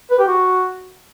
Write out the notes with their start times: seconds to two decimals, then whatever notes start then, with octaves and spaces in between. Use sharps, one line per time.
0.11 B4
0.19 G4
0.28 F#4